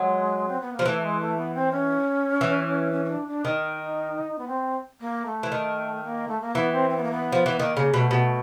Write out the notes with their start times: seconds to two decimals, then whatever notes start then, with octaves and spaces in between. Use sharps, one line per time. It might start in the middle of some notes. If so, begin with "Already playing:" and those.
Already playing: F#3 G#3
0.48 C4
0.61 B3
0.73 A#3
0.79 F3
0.85 E3 A3
1.03 G#3
1.20 A3
1.37 B3
1.55 C4
1.72 C#4
2.41 E3
2.92 C#4
3.05 C#4
3.09 D4
3.28 D4
3.45 D#3 D#4
4.38 B3
4.48 C4
5.01 A#3
5.26 A3
5.43 E3
5.52 D#3
6.04 A#3
6.28 A3
6.41 A#3
6.55 E3 B3
6.72 C4
6.89 C4
6.97 B3
7.04 A#3
7.11 B3
7.32 F3
7.46 E3
7.59 D#3 A#3
7.76 C#3 A#3
7.94 B2 A3
8.11 B2